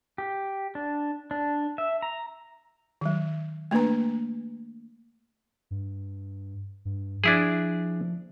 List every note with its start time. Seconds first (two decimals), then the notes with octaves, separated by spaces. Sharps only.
0.18 G4
0.75 D4
1.31 D4
1.78 E5
2.02 A#5
3.01 D#3 F#3
3.71 A3 A#3 D4 B4 A#5
5.71 G2
6.85 G2
7.24 F3 D4 E4 G#4